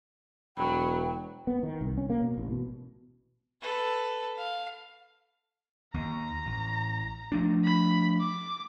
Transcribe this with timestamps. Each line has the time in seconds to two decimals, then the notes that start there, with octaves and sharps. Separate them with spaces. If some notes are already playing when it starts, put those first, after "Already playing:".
0.57 E1 F#3 G5 B5
1.47 B3
1.63 D#3
1.81 C2
1.97 C#4
2.10 A#3
2.22 B2
2.38 A1
2.51 B2
3.62 A4 B4
4.38 F5
5.94 D#2 A#5
6.46 A1
7.32 F3 A3 D4
7.64 B5
8.21 D6